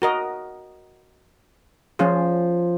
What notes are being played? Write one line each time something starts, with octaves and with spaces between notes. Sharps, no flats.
F#4 A#4 D#5
F3 C#4 F4 G#4